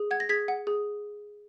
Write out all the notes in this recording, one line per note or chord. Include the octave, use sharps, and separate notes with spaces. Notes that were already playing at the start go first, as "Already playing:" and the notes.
Already playing: G#4
F#5 G#6
A#6
G#4 G#6 B6
F#5
G#4